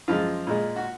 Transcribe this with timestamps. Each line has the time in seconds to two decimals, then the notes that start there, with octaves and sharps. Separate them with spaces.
0.08 F#2 F3 G#3 F4
0.47 A#2 G#3
0.76 F#4